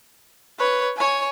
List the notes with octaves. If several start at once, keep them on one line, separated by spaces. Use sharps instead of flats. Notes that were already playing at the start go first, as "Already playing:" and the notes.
B4 C#5
C#5 G#5